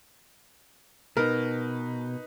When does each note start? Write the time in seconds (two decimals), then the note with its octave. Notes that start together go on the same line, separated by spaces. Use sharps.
1.17 B2 D#4 A#4 B4